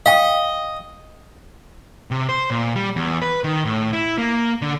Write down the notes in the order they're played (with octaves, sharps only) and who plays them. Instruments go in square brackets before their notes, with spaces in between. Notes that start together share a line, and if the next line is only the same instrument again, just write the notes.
[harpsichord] D#5 [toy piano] F5 G5
[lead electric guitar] C3
C5
A#2
G3
E2
B4
D#3
A2
E4
A#3
D3